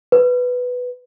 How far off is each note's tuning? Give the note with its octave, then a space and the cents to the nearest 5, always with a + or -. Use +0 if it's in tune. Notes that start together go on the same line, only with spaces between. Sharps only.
B4 +5